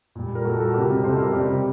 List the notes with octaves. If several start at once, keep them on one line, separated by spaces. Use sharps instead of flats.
A#2 G3
A#4
A#2 G3 F#4 A4
F#4 A4
C3 G3 G4 A#4
C3 G3 A4 C5
A#4 D5
C3 G3 G4 A#4